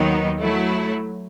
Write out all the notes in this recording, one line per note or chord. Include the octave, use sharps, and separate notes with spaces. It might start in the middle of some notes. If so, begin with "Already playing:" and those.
Already playing: D#2 D#3 F#3 B3 D#4
F#3 A3 E4